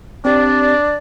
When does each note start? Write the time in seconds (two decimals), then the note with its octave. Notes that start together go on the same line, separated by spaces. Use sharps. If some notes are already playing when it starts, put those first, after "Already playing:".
0.25 C4 D4 G4 D5